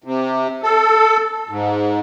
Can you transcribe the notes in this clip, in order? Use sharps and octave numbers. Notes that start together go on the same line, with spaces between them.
C3
A4
G#2